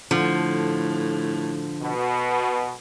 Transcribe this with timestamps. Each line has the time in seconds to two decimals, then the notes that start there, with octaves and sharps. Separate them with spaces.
0.11 A2 D3 F3
1.82 B2